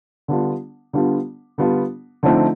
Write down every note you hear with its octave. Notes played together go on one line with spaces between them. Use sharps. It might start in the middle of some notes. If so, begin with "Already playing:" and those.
D3 G3 B3 D4 F4
D3 G3 B3 D4 F4
D3 G3 B3 D4 F4
D3 F3 A3 C4 D#4